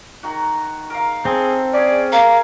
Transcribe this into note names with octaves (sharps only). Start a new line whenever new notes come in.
D#3 F#4
A#4 F5
C4 G#4 A4
C#4 G#4 D5
A#4 F5